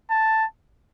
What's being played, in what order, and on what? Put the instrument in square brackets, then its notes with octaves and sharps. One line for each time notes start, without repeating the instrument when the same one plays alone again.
[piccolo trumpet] A5